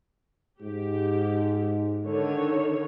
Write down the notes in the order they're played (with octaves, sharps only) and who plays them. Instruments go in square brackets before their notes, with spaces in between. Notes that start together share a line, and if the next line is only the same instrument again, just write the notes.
[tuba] G#2 [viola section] G4
[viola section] D3 D#3 C#5